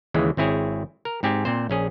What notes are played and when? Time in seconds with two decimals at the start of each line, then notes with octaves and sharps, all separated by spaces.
0.14 D#2 C#3 E3 G#3
0.37 G#1 C4 E4 G#4 C#5
1.05 A#4
1.23 G#2 C4 G4 G#5
1.45 A#2 C4 C5
1.70 A#1 C#4 G#4